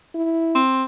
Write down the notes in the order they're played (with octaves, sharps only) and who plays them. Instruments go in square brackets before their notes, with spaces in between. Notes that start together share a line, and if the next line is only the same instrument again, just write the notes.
[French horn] E4
[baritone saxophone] C4